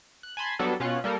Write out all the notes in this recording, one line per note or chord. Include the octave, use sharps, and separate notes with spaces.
F#6
G#5 A5 B5 C6
F#3 G3 B3 D4 F#4 A4
B2 C#4 F4 F#6
G3 A#3 A4 A#4